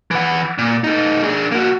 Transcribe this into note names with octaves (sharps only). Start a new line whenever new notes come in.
E3 F#5
A#2
A3 D#4
D4 G#4
A#3 F#4